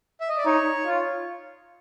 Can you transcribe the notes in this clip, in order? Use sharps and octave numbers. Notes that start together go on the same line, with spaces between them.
E5
D#5
D5
D#4 C#5
F4